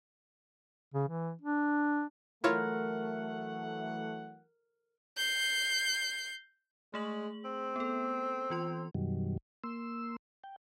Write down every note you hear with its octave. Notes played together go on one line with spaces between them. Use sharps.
C#3
E3
D4
E3 F#3 A3 E4 F4 A#4 C#5 F#5
G6 C7
G#3 A3 G#4 F#7
C4
B3 A4
E3 F4 C6
F#2 B2 D#3 F#3 G3
A#3 C6 E6
G5